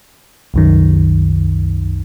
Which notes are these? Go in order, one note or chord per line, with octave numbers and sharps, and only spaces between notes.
C2 F#2 D#3